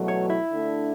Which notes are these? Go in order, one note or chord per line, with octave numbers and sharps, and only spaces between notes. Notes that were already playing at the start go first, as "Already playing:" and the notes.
Already playing: E2 B2 F#3 A3
C#5
E4
D3 A3 D4